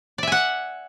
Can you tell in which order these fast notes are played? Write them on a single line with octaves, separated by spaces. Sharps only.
D5 E5 G#5 F#5